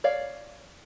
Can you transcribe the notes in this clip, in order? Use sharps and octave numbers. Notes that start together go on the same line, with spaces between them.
C#5 D5 F5